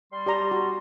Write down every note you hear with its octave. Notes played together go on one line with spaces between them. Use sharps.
G3 C6
G4 D5 A#5
F#4